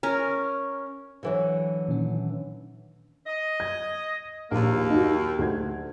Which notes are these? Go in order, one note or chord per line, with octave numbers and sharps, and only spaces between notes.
C#4 A#4
D3 E3 F#3
A#2 D#3 C#4
D#5
G#6
A#1 D#2 A#3
D#4 F#4
D2 G#6